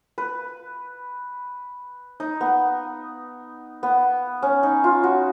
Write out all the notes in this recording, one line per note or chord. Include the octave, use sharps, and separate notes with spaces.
B4
D#4
B3
B3
C#4
D#4
F4
F#4